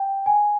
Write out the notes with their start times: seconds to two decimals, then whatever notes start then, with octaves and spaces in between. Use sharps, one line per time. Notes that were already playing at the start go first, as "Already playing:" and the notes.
Already playing: G5
0.26 G#5